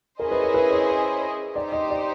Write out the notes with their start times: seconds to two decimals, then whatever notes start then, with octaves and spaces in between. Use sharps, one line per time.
0.19 C#4 E4 G#4 A#4 C5 D#5
0.31 B4
0.42 A#4
0.54 B4
0.71 C#5
1.56 D#4 G4 C5 D5
1.72 D#5
1.90 D5